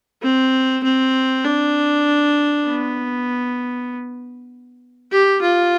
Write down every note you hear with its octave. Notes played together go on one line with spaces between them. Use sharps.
C4
C4
D4
B3
G4
F4